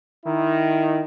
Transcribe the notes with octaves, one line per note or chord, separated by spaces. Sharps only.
D#3 E4